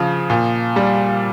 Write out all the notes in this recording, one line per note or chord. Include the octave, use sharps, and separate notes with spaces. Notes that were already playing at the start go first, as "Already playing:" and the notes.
Already playing: C#3 F3
A#2
G3